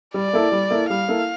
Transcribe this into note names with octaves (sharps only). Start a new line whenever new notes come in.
G3 D5
A#3 E4 A4
G3
A#3 E4 A4
G3 F5
A#3 E4 A4